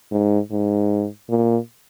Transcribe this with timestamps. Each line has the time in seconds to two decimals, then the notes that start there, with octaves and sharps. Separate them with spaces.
0.11 G#2
0.51 G#2
1.30 A#2